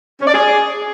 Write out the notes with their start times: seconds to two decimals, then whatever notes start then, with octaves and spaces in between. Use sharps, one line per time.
0.20 C#4
0.27 D5
0.34 G#4